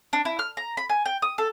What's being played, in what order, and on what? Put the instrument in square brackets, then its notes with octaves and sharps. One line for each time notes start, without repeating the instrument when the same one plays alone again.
[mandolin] D4
E4
F6
A#5
B5
G#5
G5
D#6
A4